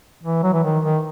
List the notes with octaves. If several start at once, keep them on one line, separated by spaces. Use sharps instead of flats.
E3
F#3
E3
D#3
D#3